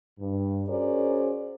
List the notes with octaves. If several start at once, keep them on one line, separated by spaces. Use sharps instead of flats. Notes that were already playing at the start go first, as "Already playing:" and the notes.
G2
C#4 F#4 G#4 A#4 C5 D5